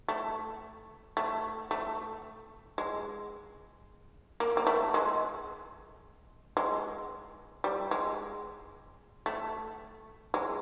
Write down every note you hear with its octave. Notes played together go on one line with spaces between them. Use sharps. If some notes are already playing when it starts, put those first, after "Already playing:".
A3
A3
A3
G#3
A#3
A#3
A3
G#3
G#3
G3
G#3
A3
G#3